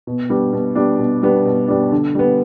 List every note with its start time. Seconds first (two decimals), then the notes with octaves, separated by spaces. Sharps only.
0.07 B2
0.29 G3 B3 D4
0.53 B2
0.75 G3 B3 D4
0.99 B2
1.23 G3 B3 D4
1.45 B2
1.68 G3 B3 D4
1.92 D3
2.15 G3 B3